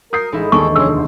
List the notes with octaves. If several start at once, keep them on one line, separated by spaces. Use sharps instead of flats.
A#4 D#6 G6 C7
A1 G#3 D#4 E4
D#2 G#3 D4 G#4 A4 C#6
F1 C#4 G#4 C6 E6
E2 D3